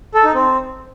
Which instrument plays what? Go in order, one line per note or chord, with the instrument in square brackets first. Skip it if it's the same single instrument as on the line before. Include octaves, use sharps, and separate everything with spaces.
[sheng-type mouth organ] A4
D#4
C4